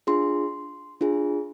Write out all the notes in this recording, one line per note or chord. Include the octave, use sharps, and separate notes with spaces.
D4 F4 G#4 C6
D4 F4 G#4